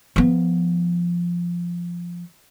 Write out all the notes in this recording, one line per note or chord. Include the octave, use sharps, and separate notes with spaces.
F3 B3